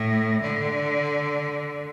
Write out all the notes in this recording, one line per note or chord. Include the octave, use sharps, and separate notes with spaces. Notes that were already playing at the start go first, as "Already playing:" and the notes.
Already playing: A2
D3